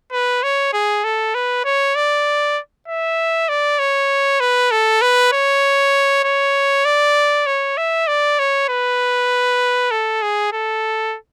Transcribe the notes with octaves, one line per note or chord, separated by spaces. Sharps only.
B4
C#5
G#4
A4
B4
C#5
D5
E5
D5
C#5
B4
A4
B4
C#5
C#5
D5
C#5
E5
D5
C#5
B4
A4
G#4
A4